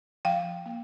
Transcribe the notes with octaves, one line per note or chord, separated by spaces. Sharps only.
F3 F5 G5
A#3